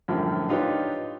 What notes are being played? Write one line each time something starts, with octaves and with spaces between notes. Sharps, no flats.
F#2 A2 D3 F3 G3
D4 D#4 F4 G4 B4 C#5